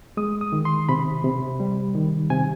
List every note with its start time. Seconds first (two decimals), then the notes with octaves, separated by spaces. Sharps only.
0.17 G#3 D#6
0.41 D#6
0.52 D#3
0.65 C6
0.89 C3 B5
1.25 C3
1.60 G3
1.95 D#3
2.30 C3 G#5